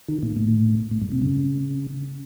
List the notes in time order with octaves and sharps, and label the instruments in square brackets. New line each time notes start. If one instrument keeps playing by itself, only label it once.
[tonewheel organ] D#3
A#2
A2
A2
G2
C3
C#3